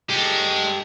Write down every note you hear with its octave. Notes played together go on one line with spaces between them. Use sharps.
G#3 G4 A4